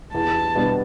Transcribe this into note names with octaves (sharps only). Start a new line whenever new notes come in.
E2 A5
B2 G3 B3 D4